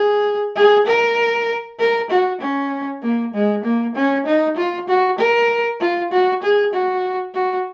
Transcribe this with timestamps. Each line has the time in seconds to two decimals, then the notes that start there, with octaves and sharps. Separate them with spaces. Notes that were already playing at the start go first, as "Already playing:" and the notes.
Already playing: G#4
0.56 G#4
0.87 A#4
1.79 A#4
2.10 F#4
2.41 C#4
3.02 A#3
3.34 G#3
3.64 A#3
3.95 C#4
4.26 D#4
4.57 F4
4.88 F#4
5.19 A#4
5.80 F4
6.11 F#4
6.42 G#4
6.73 F#4
7.34 F#4